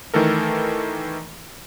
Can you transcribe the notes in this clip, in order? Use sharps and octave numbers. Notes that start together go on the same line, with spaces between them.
D#3 E3 A3 A4 A#4